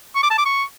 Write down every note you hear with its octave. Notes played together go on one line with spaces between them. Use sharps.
C#6
D6
A5
D6
C#6